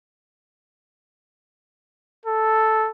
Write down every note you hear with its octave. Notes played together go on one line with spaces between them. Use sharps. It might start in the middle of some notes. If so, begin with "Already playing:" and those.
A4